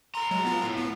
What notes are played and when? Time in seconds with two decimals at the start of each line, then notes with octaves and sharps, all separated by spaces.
0.15 A4 A#5 C6
0.31 F#3 G#3
0.45 B3 F4
0.64 A2
0.77 B3